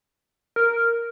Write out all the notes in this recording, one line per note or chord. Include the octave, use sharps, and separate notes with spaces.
A#4